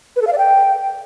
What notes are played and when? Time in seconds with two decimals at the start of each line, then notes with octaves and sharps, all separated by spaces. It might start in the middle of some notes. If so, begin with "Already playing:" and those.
0.16 B4
0.22 A4
0.27 F5
0.33 D5
0.38 G5